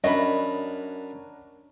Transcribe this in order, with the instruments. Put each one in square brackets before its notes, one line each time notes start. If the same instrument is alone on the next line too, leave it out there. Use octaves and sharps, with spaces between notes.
[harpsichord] F#2 B5 [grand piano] D4 A#4 C#5 [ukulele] D#5